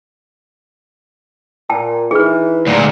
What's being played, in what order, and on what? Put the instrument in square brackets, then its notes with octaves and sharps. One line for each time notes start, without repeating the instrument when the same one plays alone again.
[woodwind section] A#2 [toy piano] G5 A5
[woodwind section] E3 [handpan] D#4 [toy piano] G#4 B4
[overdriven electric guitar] D2 A#2 [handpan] G#3 D5